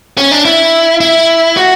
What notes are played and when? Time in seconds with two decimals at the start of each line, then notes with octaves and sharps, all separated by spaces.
0.18 C#4
0.31 D4
0.45 E4
1.00 E4
1.57 F#4